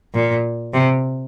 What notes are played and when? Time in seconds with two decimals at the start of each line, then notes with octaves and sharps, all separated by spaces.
0.14 A#2
0.74 C3